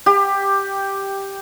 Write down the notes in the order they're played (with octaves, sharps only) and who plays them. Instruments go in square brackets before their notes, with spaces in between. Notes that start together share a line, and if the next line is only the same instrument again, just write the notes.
[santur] G4